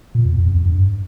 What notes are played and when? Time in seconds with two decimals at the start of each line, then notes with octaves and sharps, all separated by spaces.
0.15 A#2
0.25 E2
0.38 E2
0.49 F2
0.65 G2